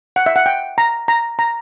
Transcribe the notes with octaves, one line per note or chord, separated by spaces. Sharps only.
F#5
E5
F#5
G5
A#5
A#5
A#5